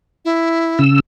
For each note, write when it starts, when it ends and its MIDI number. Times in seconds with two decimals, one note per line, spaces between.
0.25 0.81 64
0.79 1.00 49
0.79 1.00 88